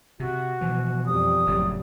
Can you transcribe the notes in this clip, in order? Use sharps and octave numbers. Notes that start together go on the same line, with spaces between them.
C3 F#4
B2 E3 F3
F2 G3 D#6
F#1 A2 F#3